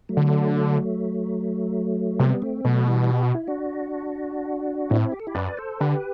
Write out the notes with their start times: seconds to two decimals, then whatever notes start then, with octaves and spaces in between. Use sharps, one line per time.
0.09 F#3 A3
0.17 D3
2.19 C3 G3 B3
2.42 A3 C4
2.65 B2 F#3 A3
2.87 E3 G3
3.10 G4
3.23 F#4
3.35 E4
3.48 D4 F#4
4.90 A2 C4 E4
5.12 G4
5.20 A4
5.27 E4 G4
5.35 F#2 B4 D5
5.57 A4 C5
5.80 D3 G4 B4